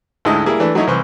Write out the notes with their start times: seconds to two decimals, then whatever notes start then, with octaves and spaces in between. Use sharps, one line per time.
0.25 D2 G#2 G#3 E4 D#5
0.46 G3 A#3 E4 G#4
0.60 E3 A3 D4
0.75 F#3 A3 D#4 E4 C#5
0.87 C2 E3 C5 C#6